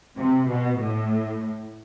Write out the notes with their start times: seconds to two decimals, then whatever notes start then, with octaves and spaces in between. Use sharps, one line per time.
0.17 C3
0.48 B2
0.78 A2